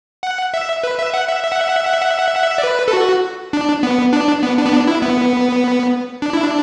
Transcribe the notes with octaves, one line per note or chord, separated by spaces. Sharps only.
F#5
E5
B4
E5
F#5
E5
E5
F#5
E5
F#5
E5
F#5
E5
F#5
E5
F#5
E5
F#5
E5
D5
B4
A4
F#4
D4
B3
D4
B3
D4
B3
D4
E4
B3
D4
E4
D4